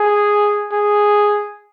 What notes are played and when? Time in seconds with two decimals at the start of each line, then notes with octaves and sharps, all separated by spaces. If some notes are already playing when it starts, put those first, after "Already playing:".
Already playing: G#4
0.72 G#4